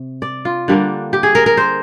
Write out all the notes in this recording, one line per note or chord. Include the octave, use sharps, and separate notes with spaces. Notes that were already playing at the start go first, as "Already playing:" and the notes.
Already playing: C3
D5
F4
D3 G3 A#3 D4
G4
G#4
A#4
A#4
C5